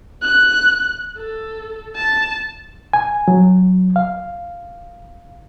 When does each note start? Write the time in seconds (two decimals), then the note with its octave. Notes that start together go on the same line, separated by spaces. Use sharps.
0.22 F#6
1.18 A4
1.96 A5
2.93 G#5
3.28 F#3
3.96 F5